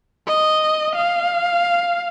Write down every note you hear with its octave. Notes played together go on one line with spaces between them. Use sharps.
D#5
F5